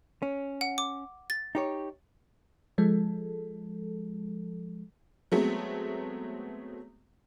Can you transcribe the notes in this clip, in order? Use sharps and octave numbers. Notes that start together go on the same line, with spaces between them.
C#4
F#5
D6
A6
D#4 G4 C#5
F3 G#3 A4
F#3 G#3 A3 B3 C4